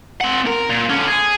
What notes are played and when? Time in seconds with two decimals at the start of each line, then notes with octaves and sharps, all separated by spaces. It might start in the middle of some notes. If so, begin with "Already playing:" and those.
0.21 C4 F#5
0.47 A#4
0.70 A#2
0.90 D3 C#4
1.08 G#4